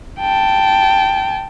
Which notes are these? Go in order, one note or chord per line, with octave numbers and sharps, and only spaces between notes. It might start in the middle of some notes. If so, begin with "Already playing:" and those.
G5 A5